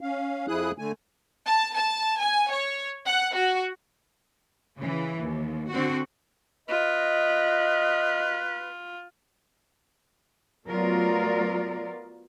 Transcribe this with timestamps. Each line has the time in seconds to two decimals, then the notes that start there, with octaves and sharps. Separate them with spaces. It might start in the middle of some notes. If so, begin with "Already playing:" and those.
0.01 C#4 F5
0.48 F2 F3 E4 G#4 D#6 F#6
0.78 D3 A3 G#5
1.46 A5
1.75 A5
2.19 G#5
2.50 C#5
3.06 F#5
3.35 F#4
4.78 C#3 E3
5.20 D#2
5.70 D3 C4 F#4
6.69 F4 B4 D#5
10.67 F#3 A3 B3 F4 A#4 D5